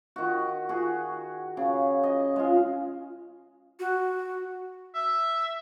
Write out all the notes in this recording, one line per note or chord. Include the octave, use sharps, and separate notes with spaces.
D#3 F#4
F#4 G#4
C#3
D#5
G#3 F4
F#4
E5